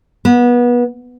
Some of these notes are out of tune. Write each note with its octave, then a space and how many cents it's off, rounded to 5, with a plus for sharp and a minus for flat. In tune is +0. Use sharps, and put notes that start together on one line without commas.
B3 -25